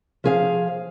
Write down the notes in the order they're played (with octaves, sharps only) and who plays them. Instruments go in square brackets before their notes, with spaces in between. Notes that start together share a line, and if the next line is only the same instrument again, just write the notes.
[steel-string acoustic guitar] F3 G#4 F5